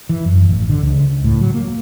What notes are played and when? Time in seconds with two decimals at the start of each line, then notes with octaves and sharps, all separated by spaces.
0.09 E3
0.25 F#2
0.49 A1
0.70 D3
0.83 C#2
1.24 A2
1.41 F#3
1.54 A#3